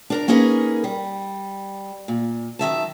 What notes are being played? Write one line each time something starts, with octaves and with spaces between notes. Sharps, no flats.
D4 A#4 A#5
A#3 C#4 D#4 G#4 A#4 B4
G3
A#2
F#2 D#3 E5 A5